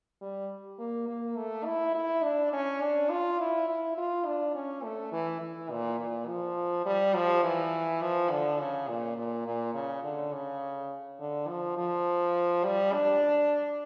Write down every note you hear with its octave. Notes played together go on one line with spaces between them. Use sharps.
G3
A#3
A#3
A3
E4
E4
D4
C#4
D4
F4
E4
E4
F4
D4
C#4
A3
E3
E3
A#2
A#2
F3
G3
F3
E3
F3
D3
C#3
A#2
A#2
A#2
C#3
D3
C#3
D3
F3
F3
G3
D4